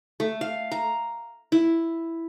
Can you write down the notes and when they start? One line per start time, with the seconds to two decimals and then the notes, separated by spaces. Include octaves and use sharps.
0.20 A3
0.41 F5
0.72 A#5
1.52 E4